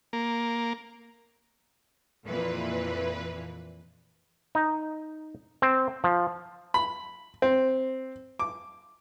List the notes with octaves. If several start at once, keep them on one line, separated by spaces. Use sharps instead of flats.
A#3
F2 A#2 E3 B4
D#4
C4
F3
B5
C4
D6